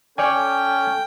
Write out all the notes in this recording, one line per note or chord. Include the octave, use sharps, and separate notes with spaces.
C#4 A4 C#5 D5 G5 G#5